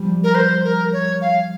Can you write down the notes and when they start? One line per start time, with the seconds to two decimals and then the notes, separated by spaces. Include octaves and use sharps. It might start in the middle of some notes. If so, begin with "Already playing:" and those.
Already playing: F3 G3
0.23 A#4
0.35 C5
0.64 A#4
0.93 C#5
1.21 F5